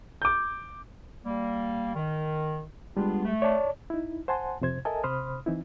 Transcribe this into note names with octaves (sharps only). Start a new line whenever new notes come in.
D6 G6
G3 A#3
D#3
G3 G#3 B3 D4 F4
A3
C#5 D5 A5
D#4 E4
C5 F#5 G#5 A5 C6
F2 C3 C5 G#6
A4 A#4 D#5 E5 G#5 A5
C3 C5 B5 C6 D#6 F6
E3 C4 D#4 E4